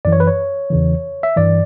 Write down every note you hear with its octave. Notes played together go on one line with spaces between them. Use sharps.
F#2 E3 D5
C#5
B4
C#5
E2 C#3 E3
E5
G2 E3 D5